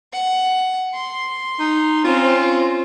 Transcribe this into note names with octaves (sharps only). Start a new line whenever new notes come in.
F#5
C6
D#4
C4 C#4 F4